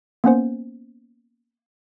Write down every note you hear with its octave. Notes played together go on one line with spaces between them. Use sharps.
A#3 B3 C#4 C5